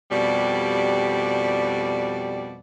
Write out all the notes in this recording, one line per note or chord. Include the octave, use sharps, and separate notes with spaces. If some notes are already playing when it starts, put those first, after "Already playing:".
F2 B2 G3 G4 D5